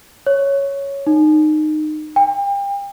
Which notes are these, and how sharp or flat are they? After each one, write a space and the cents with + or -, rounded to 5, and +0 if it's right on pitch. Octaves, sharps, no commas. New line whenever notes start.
C#5 +0
D#4 -20
G5 +35